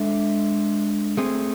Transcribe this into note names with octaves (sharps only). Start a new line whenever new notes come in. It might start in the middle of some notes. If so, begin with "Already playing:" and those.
Already playing: G#3 D4 A4 E5
A3 C4 G#4